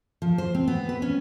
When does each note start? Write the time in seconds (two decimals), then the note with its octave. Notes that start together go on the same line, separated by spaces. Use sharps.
0.22 F3
0.38 C5
0.55 C4
0.68 B3
0.89 B4
1.02 C#4